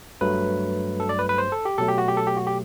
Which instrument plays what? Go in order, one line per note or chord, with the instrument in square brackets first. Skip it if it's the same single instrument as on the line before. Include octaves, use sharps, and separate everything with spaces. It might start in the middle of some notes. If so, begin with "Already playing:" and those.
[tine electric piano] G2 F#3 A3 B4
A4
D5
B4
B4
C5
A4
G4
B2 F#3 A3 A4
G4
F#4
G4
A4
G4
F#4
G4